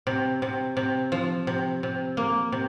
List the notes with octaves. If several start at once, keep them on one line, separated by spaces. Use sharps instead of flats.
C3
C3
C3
F3
C3
C3
A#3
C3